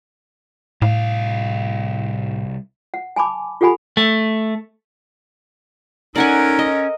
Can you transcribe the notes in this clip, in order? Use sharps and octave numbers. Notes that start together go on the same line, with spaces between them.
C2 A2 F5
F#5
G#5 A5 B5 D6
F4 G4 A4 F#5 G#5 B5
A3
C#4 D#4 A4 A#4 D5 F#5 G#5
D#5